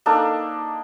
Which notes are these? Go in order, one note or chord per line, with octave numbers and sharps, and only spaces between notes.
A#3 D4 D#4 A4